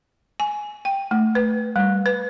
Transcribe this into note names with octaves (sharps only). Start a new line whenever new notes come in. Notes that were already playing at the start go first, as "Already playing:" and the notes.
G#5
G5
A3
B4
G3
B4